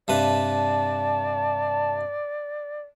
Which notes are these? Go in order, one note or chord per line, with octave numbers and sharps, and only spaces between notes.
G2 C3 B4 D5 A5